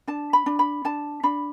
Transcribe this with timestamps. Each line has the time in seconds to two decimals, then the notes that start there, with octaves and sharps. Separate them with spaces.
0.07 D4 A5
0.33 B5
0.46 D4
0.59 B5
0.85 D4 A5
1.23 D4 B5